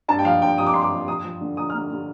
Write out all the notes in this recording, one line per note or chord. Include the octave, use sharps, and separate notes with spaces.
G2 A5
G5
F3 F5
G2 G5
F3 D#6
D6
G2 C6
D6
F3
F3 D#6
F3
D3
F3 D#6
F6
D3
D3